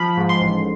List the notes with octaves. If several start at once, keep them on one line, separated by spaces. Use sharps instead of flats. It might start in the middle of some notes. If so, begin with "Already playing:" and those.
Already playing: F3 B5
G#2
C6
A1